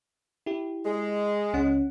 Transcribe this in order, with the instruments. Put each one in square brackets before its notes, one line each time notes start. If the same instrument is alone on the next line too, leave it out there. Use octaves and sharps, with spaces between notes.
[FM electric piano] E4 G4
[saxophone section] G#3
[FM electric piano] C#2 C#4 F#5